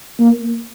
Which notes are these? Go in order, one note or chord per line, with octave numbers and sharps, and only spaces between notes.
A#3